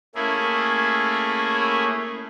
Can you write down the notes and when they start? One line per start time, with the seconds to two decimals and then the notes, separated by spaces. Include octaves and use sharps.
0.15 A3 A#3 C#4 E4 G#4